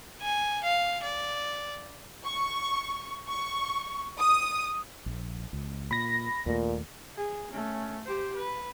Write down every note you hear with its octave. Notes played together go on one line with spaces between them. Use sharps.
G#5
F5
D5
C#6
C#6
D#6
A#1
C#2
A#2 B5 A#6
D#2 A#2 A3
G#4
A3 C#4
G4 C5
B4